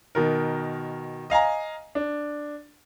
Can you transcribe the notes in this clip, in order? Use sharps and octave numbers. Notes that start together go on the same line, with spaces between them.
B2 D#3 A#4
D#5 F5 G#5 A#5
D4